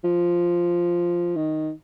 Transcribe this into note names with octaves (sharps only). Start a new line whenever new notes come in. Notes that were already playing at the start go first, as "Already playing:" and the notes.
F3
D#3